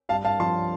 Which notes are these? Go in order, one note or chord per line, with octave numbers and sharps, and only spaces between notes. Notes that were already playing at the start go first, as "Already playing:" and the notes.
G2 F5 A5
G2 F5 A5
F3 A5 C6